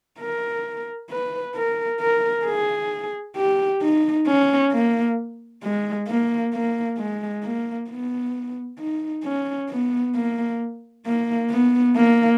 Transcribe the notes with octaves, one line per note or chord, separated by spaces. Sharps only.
A#4
B4
A#4
A#4
G#4
G4
D#4
C#4
A#3
G#3
A#3
A#3
G#3
A#3
B3
D#4
C#4
B3
A#3
A#3
B3
A#3